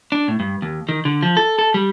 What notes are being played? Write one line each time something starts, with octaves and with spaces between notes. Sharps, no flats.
D4
A2
G2
D#2
D#3
D3
F3
A4
A4
G3